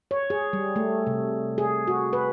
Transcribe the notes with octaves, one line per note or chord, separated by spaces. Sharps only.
C#5
G#4
G3
A3
C3
G#4
F#4
B4